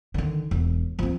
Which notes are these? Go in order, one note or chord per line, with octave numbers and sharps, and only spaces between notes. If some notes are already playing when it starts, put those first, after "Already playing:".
D3 D#3
E1
F3 C4